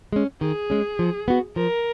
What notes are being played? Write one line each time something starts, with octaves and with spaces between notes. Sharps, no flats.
G#3 C#4
D#3 G#4
G#3 C#4
F3
B3 F#4
F3 A#4